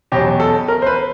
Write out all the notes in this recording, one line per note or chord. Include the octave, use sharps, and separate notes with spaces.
E2 B2 F#3 G4
A4
A#4
C5
B4